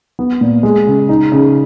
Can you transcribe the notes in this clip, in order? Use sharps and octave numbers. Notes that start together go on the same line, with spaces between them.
B3
A#2
G#3
C#3
D#4
C#3